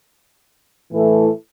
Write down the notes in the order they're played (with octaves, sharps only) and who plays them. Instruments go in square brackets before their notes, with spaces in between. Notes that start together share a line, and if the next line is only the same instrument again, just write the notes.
[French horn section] A2 E3 A3 E4 A4